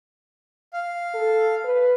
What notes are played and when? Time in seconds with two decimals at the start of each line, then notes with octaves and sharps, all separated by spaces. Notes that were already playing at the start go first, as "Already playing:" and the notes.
0.73 F5
1.14 A4
1.64 B4